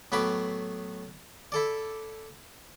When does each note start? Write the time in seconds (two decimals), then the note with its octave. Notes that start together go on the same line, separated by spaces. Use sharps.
0.12 A2 F#3 B3 B5 D6
1.52 E4 A4 D5